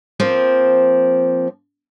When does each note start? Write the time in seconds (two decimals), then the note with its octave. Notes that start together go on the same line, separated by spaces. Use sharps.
0.20 F3 A#3 C4